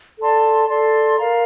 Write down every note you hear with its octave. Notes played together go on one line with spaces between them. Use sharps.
A4 D5 A5 C6
A4 D5 A5 C6
A#4 F5 A#5